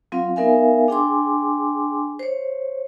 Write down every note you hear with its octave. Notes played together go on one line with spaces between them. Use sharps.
F#3 C4 F4 F5
B3 D#4 A#4 E5 F5 G#5
D4 G#4 G5 G#5 C6 D6
C5 C#5